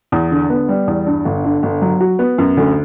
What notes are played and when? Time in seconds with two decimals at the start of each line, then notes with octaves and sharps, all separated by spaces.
0.12 E2
0.31 D3
0.50 B3
0.69 G3
0.87 E2
1.06 G2
1.25 G1
1.44 D3
1.63 G1
1.82 F#3
2.01 F#4
2.19 B3
2.38 F#2
2.57 D2